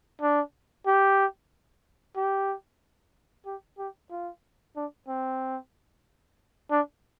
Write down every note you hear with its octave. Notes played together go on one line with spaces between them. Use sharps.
D4
G4
G4
G4
G4
F4
D4
C4
D4